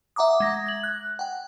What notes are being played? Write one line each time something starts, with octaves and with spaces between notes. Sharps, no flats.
E5 F#5 A#5 D6 D#6
G#3 A#6
G#6 F#7
F#6
F#5 G5